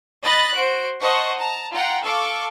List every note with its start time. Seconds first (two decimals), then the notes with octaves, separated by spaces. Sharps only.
0.23 D#5 B5 F#6 A6
0.54 F#4 C5 D7
1.01 C5 D#5 F#5 A5 C#6
1.38 A5 A#5
1.73 F4 F#5 G5 A#5
2.02 A4 F5 C#6 D6